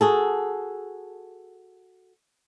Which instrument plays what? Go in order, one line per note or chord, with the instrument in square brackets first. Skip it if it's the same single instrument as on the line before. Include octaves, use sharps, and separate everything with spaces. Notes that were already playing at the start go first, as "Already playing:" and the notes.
[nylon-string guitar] F#4 G#4 A4